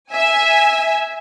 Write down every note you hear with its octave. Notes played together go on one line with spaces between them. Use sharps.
E5 G#5